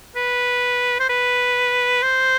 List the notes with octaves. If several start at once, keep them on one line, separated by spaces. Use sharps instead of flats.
B4
C5
B4
C5